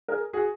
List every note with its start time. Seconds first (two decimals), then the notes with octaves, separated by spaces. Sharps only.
0.08 G#4 A#4
0.33 F#4 G#4